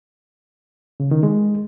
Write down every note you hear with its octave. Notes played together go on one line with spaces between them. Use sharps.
C#3
D#3
G#3